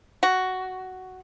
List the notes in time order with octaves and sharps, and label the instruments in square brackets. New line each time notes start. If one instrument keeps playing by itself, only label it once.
[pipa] F#4